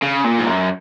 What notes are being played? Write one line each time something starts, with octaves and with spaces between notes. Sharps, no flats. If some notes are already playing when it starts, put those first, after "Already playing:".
C#3
A#2
G#2
F#2